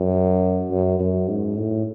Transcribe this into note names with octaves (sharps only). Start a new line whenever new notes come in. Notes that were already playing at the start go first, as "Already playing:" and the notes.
Already playing: F#2
F#2
F#2
G#2
A2